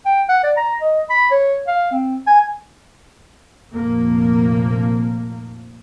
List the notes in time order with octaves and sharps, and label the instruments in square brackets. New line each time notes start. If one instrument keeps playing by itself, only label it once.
[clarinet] G5
F#5
D5
A#5
D#5
B5
C#5
F5
C4
G#5
[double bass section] F1 A#2 F3 A#3